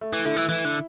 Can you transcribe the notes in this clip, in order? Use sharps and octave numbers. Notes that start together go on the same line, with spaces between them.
A3
E3
D3 E4
E3
E3 E4
D3